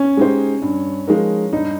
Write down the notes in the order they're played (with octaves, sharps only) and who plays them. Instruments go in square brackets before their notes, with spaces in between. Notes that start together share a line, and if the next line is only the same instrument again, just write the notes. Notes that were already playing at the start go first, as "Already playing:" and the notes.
Already playing: [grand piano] C#4
[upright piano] G#3 D#4 G4 C5
G2
F3 G#3 D#4 A#4
[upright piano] G2 [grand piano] D#4